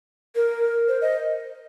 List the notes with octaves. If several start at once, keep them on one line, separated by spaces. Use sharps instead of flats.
A#4
C5
D#5